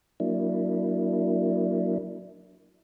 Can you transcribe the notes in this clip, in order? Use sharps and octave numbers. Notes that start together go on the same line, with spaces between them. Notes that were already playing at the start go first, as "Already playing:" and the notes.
F#3 A#3 D4 E4